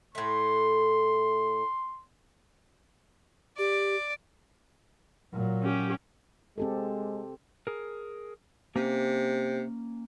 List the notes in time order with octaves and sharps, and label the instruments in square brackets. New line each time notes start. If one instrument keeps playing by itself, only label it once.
[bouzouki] A2 A3 [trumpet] C6
[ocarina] G4 [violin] D5
[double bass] A#2 F#3
[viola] C#4 G4
[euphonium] G#3 [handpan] C4 G4 A4
[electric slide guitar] G#4 A#4
[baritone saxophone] C3 [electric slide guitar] A#3 C#4